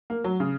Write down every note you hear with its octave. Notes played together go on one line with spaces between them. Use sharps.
A#3
F#3
C#3